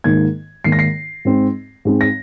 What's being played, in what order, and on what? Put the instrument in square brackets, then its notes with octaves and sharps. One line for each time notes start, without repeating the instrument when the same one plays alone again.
[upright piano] G#2 D#3 A#3 G#6
G#2 D#3 A#3 C7
A#6
C7
G#2 G#3 C4
G#2 G#3 C4
A#6